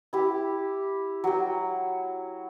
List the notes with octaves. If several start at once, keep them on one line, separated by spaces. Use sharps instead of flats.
E4 G4
F#3 G5